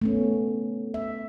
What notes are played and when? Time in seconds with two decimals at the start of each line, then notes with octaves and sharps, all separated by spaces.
0.02 A3 B3 C#4
0.94 E5